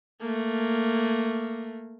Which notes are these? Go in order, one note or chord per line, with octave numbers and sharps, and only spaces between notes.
A3 A#3